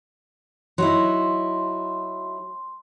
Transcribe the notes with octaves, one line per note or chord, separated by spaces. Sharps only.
F#3 D#4 E4 C6